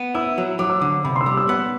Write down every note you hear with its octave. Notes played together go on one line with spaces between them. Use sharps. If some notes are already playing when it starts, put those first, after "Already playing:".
Already playing: B3
E4 E6
F#3
F#3 D6
E6
D3 D6
C3 B5
C6
E6
G3 D6
E6
B3 F#6